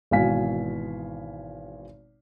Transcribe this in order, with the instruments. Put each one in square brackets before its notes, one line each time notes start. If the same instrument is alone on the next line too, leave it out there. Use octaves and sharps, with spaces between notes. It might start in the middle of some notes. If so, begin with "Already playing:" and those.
[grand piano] G#1 B2 E3 F5 G#5 B6